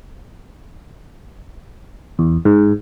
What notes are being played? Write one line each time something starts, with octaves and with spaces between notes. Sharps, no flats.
E2
G#2